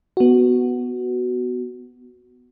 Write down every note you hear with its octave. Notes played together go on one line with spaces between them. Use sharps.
B3 F#4